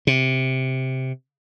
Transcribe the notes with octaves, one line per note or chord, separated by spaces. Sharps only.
C3